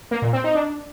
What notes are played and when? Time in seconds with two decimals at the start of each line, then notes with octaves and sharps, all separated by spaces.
0.11 A#3
0.22 A#2
0.33 C4
0.44 D#4
0.55 D4